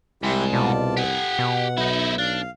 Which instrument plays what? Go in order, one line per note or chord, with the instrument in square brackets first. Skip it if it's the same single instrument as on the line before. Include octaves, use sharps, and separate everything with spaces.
[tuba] C2 [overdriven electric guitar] G#2 [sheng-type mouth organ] E4 G4 C6
[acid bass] B2 [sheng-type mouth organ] F4 D5 A5
[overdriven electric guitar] G4 G#5 [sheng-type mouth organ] F#5
[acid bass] B2
[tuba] B1 [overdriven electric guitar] D#4 E4
[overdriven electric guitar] D4 [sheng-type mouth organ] F5